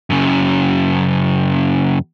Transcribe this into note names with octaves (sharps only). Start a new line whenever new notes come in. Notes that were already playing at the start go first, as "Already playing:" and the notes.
F#2 C#3